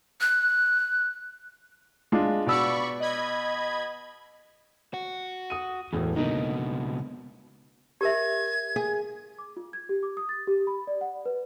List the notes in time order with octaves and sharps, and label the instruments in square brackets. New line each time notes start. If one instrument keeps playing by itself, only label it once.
[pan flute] F#6
[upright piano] G#3 D4 F4
[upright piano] B2 E6 [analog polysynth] D5 B5 C#6
[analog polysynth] D#5 B5 G#6
[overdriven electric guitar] F#4
[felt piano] D#6 D#7
[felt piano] E1 A2 [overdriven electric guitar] E2
[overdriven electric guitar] C#2 B2 [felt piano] D3 A#3 D#4
[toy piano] G4 A#4 E5 [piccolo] G#6
[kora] G#4
[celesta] D6
F4
G#6
G4
D6
D#6
A6
G4
B5
D5
F#5
B4